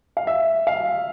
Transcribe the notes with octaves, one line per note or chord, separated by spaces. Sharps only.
F5
E5
F5